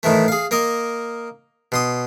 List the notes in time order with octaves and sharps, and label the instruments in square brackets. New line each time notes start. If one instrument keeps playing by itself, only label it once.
[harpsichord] A2 D#3 E3 A3
G#4 F5
A#3 A#4 D#5
B2 C6 D#6